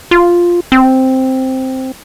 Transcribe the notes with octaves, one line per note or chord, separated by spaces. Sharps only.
F4
C4